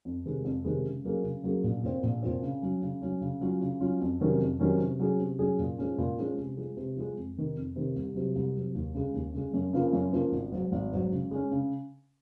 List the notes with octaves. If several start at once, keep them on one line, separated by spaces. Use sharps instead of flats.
F2
C3 D#3 G#3
F2
C3 D#3 G#3
C#3
F#3 A#3 C#4 G#4
C#3
F#3 A#3 C#4 G#4
A#1
A#2 F3 C4
A#1
A#2 F3 C4
C#3
F#3 C#4
C#3
F#3 C#4
C#3
F#3 C#4 F4
C#3
F#3 C#4 F4
F2
C3 D#3 F#3 C#4
F2
C3 D#3 F#3 C#4
C3
F#3 C#4 G#4
C3
F#3 C#4 G#4
A#2
F3 G#3 C#4
A#2
F3 G#3 C#4
C3
F3 G#3
C3
F3 G#3
F2
C3 D#3
F2
C3 D#3
C2
C3 F#3
C2
C3 F#3
D#2
C#3 G#3
D#2
C#3 G#3
F#2
C#3 F3 A#3 F4
F#2
C#3 F3 A#3 F4
G#1
G#2 F#3
G#1
G#2 F#3
C#3
G#3 C#4
C#3